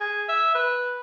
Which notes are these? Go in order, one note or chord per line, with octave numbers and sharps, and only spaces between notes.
G#4
E5
B4